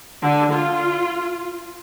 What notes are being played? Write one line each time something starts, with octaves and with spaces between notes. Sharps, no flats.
D3
F4